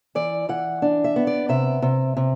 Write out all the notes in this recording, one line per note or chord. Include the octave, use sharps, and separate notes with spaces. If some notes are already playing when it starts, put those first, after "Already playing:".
E3 D5
E3 F#5
D4
E5
B3
D5
C3 E5
C3
C3